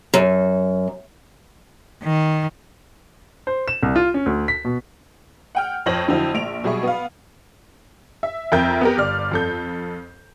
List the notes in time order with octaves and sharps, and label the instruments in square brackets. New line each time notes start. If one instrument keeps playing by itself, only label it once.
[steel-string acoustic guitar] F#2
[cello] D#3
[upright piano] C5
E7
C2
F4
C#4
D2
B6
B2
[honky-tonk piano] F#5 G5 F6
F2 C5 C#5 A#6 F#7
F2 D3 F#3 E4 C5 E6
A#1 D7 F7
B2 F#3 G3 G#4 E5 C#6
B3 F5
E5
F2 A#4 E5 G5 G6
B3 G4 A#4
G1 D5 F6
F2 A4 G6